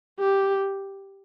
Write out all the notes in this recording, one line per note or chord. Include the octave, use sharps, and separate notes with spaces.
G4